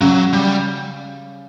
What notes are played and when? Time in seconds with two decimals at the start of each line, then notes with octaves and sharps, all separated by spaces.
0.01 C#3 F#3
0.33 G3